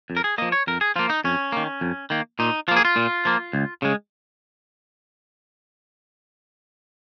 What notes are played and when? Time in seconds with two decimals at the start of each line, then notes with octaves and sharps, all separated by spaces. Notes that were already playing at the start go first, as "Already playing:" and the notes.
0.10 F2
0.17 A#4
0.24 G#4
0.38 F3 A#3 D#5
0.52 C#5
0.67 F2 A#4
0.81 G#4
0.96 F3 A#3 F4
1.10 D#4
1.24 F2 C#4
1.52 D#3 A#3
1.81 F2
2.10 D#3 A#3
2.39 A#2 D#4
2.68 F3 F4
2.71 A#3
2.76 G#4
2.85 F4
2.96 A#2
3.25 F3 A#3
3.53 C#2
3.82 C#3 G#3